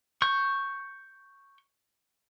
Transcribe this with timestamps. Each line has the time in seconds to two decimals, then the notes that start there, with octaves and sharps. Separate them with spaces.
0.22 C#6 G6